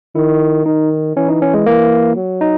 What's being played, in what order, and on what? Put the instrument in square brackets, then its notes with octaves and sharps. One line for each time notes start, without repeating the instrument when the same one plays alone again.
[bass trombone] D#3 [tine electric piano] E4
[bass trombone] D#3 [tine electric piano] D#4
[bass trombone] E3 [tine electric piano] C#4
[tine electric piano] D#4
C#4
G#3
[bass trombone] E3 [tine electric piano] A#3
[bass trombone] F#3
[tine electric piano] D#4